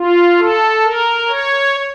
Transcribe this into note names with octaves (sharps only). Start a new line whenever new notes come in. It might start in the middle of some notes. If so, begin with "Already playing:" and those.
Already playing: F4
A4
A#4
C#5